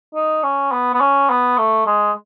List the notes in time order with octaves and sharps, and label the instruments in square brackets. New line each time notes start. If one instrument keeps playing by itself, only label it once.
[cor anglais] D#4
C#4
B3
B3
C#4
B3
A3
G#3